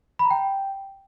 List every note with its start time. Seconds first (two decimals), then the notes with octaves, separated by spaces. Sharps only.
0.19 B5
0.25 A#5
0.31 G5